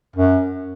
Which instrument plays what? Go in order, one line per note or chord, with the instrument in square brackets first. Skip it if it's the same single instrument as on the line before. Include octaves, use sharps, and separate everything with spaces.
[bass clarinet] F#2